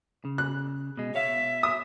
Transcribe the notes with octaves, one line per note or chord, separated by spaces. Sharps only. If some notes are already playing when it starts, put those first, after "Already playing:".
C#3
F#6
B2 G#3
B2 C#5 E5 F5
D#6